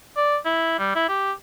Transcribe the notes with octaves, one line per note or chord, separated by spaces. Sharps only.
D5
E4
G3
E4
G4